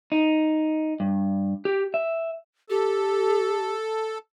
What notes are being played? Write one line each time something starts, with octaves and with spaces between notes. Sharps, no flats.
D#4
G2
G4
E5
G4 A4